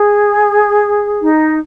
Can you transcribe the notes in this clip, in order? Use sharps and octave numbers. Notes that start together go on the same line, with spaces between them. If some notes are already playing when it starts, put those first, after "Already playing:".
Already playing: G#4
D#4